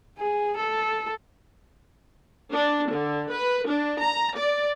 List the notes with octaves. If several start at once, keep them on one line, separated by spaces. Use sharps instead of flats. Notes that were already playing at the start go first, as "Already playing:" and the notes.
G#4
A4
D4
D3
B4
D4
A#5
D5